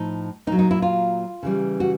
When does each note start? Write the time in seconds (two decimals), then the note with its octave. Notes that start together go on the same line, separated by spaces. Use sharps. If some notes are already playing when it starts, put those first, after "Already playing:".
Already playing: A2 F3 D#4
0.47 A#2 D#4
0.52 F#3
0.59 D#4
0.71 E4
0.82 F4
1.43 C#3 E3 G3
1.80 F#4